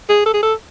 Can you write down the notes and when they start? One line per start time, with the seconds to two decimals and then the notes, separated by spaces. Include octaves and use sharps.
0.10 G#4
0.26 A4
0.34 G#4
0.43 A4